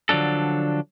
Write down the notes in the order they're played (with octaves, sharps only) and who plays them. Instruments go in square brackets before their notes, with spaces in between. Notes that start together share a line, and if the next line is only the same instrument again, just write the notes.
[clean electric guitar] D3 F3 F#3 D4 A4